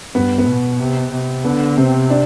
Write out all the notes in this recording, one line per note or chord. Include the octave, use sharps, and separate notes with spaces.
G2 B3
B3
B2
C3
C3
D3 B3
C3 C4
D4